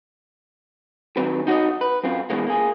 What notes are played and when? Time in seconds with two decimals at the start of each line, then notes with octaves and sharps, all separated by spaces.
1.17 D#3 F#3 C4 B4
1.47 D#4 F#4 G#4 C#5 D#5
1.81 B4
2.04 F#2 C4 F4
2.30 B2 E3 F3 G#3 A#3
2.47 A#3 G#4